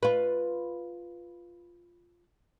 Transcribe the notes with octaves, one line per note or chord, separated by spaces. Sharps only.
F4 B4